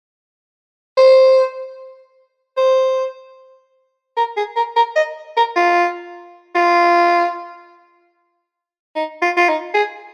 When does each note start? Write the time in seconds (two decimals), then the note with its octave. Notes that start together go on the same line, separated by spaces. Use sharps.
0.97 C5
2.57 C5
4.17 A#4
4.37 G#4
4.56 A#4
4.76 A#4
4.96 D#5
5.37 A#4
5.56 F4
6.55 F4
8.96 D#4
9.22 F4
9.37 F4
9.49 D#4
9.74 G#4